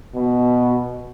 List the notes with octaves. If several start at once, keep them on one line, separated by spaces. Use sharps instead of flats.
B2